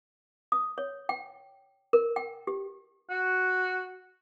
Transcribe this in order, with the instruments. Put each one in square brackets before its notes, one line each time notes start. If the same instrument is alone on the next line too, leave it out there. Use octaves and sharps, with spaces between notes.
[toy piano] D#6
C#5
G5
A#4
G5
G4
[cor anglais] F#4